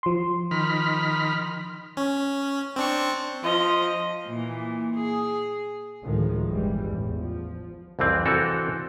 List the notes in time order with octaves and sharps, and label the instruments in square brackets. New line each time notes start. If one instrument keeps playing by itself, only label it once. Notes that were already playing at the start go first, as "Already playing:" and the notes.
[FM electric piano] F3 C6
[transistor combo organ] D#3 B5 F6
[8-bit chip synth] C#4
C4 D4 C#6
[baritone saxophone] F3 [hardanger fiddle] D#5
[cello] A#2 E3
G#4
[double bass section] D2 A2 D#3 F3 G#3
G1 E3 G3 G#3
A1 E2 A2
F3
[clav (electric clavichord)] C2 F2 E3 C4
E3 C4 F#4 A4 A#4